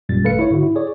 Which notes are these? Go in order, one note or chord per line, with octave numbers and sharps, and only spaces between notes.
G#1 F#2 A#2 G3 A6
G#1 A3 A4 B4 F5 C#7
E4 C#5
G#2 D3 F#4
E4
G#4 C#5 D5